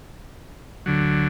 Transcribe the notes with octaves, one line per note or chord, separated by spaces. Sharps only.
D2 D3 F#3